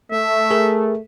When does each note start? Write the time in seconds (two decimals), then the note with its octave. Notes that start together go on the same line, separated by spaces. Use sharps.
0.12 A3 E5
0.51 G#4 A#4